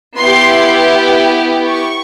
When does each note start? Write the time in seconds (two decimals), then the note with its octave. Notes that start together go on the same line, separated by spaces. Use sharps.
0.17 B3 E4 G4 C6
1.69 C#6